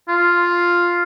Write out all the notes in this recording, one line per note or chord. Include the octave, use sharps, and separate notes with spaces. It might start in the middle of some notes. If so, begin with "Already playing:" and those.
F4